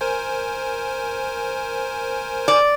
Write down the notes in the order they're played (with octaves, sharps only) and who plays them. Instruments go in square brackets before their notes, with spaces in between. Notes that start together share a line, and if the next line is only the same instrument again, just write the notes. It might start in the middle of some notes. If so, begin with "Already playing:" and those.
[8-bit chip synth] A#4 C5 G#5
[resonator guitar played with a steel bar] D5